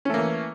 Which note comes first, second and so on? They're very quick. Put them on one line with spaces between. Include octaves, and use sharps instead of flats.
C#4 A3 A#3 E3